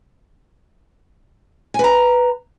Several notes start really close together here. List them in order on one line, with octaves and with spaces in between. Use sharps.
G#5 B4 A#5